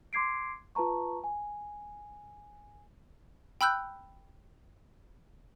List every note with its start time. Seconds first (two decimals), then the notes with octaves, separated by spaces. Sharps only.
0.13 C6 D6 G#6 C7 D7
0.75 F4 B4 A5 A#5 C#6
1.24 G#5
3.61 G5 B5 E6 F#6 G6